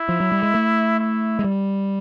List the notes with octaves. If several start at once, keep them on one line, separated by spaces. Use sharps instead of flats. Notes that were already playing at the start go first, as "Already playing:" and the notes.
Already playing: E4
F3
F#3
G3
G#3
A3
E4
G#3
G3